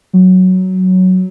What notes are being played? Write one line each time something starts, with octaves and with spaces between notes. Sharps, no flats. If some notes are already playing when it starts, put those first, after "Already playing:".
F#3